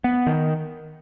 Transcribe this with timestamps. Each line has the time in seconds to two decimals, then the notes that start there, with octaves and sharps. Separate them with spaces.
0.04 B3
0.27 D#3